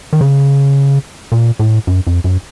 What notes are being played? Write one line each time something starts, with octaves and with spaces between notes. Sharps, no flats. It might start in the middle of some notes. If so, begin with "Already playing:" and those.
D#3
C#3
A#2
A2
F#2
F2
F#2